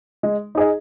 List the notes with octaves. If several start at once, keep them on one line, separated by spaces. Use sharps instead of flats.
G#3
D#4 G#4 D#5